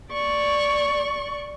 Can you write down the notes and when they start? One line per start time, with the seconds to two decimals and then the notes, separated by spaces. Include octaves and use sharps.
0.12 D5 C#6